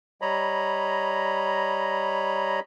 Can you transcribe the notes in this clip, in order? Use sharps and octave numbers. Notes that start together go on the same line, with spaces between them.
G3 C#5 D#5 A#5 B5